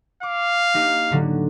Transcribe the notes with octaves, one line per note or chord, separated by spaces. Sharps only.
F5 D6
A#3 D#4 G4
A2 D3 F#3